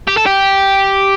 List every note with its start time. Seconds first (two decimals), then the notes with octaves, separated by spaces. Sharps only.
0.08 G4
0.17 A4
0.26 G4